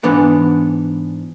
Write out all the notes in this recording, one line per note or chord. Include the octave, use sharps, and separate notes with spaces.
G#2 E3 B3 D4 F#5